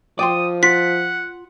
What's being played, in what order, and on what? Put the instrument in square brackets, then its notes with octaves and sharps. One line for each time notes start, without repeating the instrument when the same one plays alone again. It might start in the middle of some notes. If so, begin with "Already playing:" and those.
[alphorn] F3 [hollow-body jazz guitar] D5 G5 C6 [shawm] D#6
[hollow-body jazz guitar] F4 [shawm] F#5 [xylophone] B6